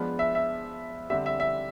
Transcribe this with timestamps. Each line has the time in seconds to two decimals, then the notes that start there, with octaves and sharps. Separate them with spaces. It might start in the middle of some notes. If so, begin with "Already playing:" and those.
Already playing: F3 G#3 B3 D4
0.19 E5
0.35 E5
1.10 D3 G3 C4 E5
1.26 E5
1.40 E5